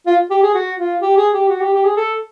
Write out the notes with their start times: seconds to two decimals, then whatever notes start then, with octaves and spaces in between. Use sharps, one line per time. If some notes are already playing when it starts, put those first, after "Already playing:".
0.06 F4
0.30 G4
0.43 G#4
0.54 F#4
0.78 F4
1.01 G4
1.17 G#4
1.34 G4
1.49 F#4
1.61 G4
1.73 G4
1.85 G#4
1.97 A4